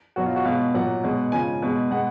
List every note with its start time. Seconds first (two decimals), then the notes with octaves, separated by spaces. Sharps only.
0.16 B2 F#3 F#4
0.26 F4
0.36 F#4
0.45 B2 G#3 F5
0.74 A#2 F#3 F#5
1.03 B2 G#3
1.32 C#3 F3 G#3 G#5
1.62 B2 G#3
1.91 B2 G#3 F#5